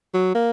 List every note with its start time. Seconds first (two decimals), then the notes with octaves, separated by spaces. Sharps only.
0.14 F#3
0.34 A#3